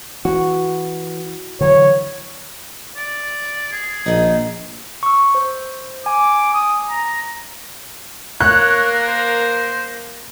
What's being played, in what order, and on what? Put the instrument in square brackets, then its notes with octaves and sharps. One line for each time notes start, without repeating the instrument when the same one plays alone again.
[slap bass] E3 [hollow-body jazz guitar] F#4
[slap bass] D3 E3 F#3 [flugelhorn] C#5
[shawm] D5
G#4
[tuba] A#1 [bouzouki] D#3 D#4
[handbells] C#6 E6
C5
[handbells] G#5 [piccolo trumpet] D6
[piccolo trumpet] D#6
A#5
[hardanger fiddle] A#3 A#4 [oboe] C#5 [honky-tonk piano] F#6
[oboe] C5